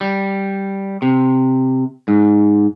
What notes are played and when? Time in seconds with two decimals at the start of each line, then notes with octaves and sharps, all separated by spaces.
0.01 G3
1.02 C3
2.08 G#2